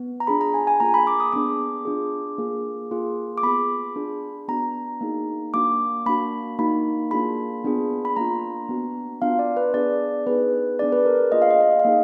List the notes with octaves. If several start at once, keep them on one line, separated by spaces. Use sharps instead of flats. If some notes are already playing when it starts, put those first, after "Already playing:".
Already playing: B3
A#5
D4 F4 G#4 B5
A#5
G#5
G#5
A#3 F4 G#4 A#5
B5
D6
D#6
B3 D4 G#4 D6
D4 F4 G#4
A#3 F4 G#4
A#3 F4 G#4
D6
B3 F4 G#4 B5
D4 F4 G#4
B3 D4 F#4 A#5
A#3 D#4 G#4
A#3 D4 F#4 D6
A#3 D4 F#4 B5
A#3 D#4 F#4 B5
A#3 D4 F4 G#4 B5
B3 D4 F4 G#4
B5
A#3 D4 F4 A#5
B3 D4 F#4
B3 D4 F4 F5
D5
B4
B3 D4 G#4 D5
B3 D#4 G#4 B4
B3 D4 G#4 D5
B4
A#4
A#3 F4 G#4 D#5
F5
D#5
F5
D#5
F5
A#3 D#4 G#4